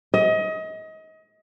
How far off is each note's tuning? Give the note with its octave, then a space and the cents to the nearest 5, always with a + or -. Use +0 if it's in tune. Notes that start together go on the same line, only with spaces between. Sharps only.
D#5 +30